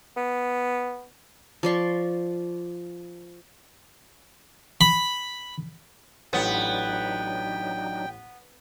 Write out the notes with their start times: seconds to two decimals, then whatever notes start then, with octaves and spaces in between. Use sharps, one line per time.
0.17 B3
1.63 F3 D5 C6 C#6
4.81 B5
6.33 A1 F#3 B3 D4 D#4 G5